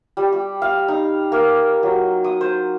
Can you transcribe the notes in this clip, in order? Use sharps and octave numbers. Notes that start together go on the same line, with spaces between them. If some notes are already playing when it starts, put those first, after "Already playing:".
G3
G4
F5
D#4
A#3
F#3
D#6
C5